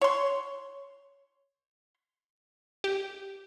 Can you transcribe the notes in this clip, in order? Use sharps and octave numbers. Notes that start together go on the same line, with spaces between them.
C#5 C6
G4